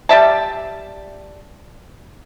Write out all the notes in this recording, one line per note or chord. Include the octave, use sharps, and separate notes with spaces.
G3 D5 E5 A5